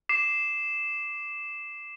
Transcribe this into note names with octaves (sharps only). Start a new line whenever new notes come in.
D6 C7 E7